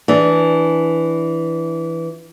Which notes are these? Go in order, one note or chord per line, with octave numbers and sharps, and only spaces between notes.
E3 D4 G#4